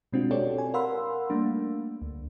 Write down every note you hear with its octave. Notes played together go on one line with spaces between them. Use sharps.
B2 G#3 C4 D4 F4 F#4
C4 F#4 G4 A4 C#5 D5
G#5
A#4 F5 F#5 B5 C6 E6
G3 A3 A#3 D4
D2